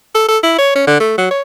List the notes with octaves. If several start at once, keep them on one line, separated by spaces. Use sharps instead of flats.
A4
A4
E4
C#5
C#4
D3
A3
F#3
C#5